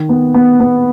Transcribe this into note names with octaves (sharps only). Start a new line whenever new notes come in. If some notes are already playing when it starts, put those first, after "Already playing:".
Already playing: D#3
B3
B3
B3